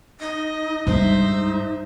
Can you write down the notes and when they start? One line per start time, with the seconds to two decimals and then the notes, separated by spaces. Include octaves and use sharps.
0.20 D#4 D#5
0.87 G2 G#3 D#4 C5 E5